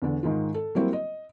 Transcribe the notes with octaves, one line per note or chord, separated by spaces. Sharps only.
E2 D3
G#2 D#3 G#3 F4
A4
F#3 G3 A#3 C4 E4 F#4
D#5